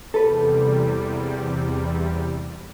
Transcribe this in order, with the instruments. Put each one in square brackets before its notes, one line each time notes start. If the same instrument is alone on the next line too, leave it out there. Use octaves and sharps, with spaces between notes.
[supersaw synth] E2 C3 G3 [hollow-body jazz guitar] A4 B4